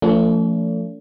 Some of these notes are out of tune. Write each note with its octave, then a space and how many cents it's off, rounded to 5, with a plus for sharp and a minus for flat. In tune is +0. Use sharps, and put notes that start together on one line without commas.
F3 -25 A3 +30 D4 -45